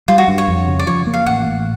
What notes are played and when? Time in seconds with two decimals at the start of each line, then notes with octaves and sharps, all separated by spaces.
0.08 G3 F4
0.18 F#4
0.28 G2
0.38 C#5
0.48 F2
0.68 C#3
0.79 D5
0.87 F3 C#5
1.07 A#3
1.14 F5
1.26 A1 F#5
1.46 A2